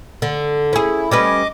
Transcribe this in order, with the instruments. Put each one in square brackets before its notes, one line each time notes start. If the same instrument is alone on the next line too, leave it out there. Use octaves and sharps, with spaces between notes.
[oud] D3
[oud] C#4 G#4 [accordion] E4
[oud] G3 C#4 B4 [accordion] D#5 D6